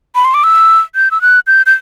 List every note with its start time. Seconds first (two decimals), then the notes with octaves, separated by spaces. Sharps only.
0.15 B5
0.25 C6
0.34 D6
0.44 E6
0.95 G6
1.11 E6
1.22 F#6
1.47 G6
1.66 G6